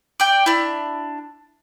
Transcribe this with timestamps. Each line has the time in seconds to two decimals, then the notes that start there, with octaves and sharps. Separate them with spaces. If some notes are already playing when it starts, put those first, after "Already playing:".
0.20 D5 G5
0.46 D4 E4